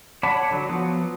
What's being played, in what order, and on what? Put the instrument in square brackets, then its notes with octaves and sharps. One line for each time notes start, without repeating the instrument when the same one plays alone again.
[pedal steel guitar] C#5 D5 F#5 A5 B5
D3 F#3
F3 F#3 B3